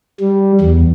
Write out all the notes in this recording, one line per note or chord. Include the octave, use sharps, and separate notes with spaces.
G3
E2